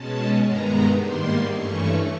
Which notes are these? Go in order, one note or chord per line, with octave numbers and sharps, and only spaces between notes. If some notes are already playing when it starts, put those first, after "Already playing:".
Already playing: B2 G#3 C#4 A5
G2 D#3 G#3 B3 A#5
G#2 D#3 G3 A#3 C6
G2 E3 A3 C#4 C#6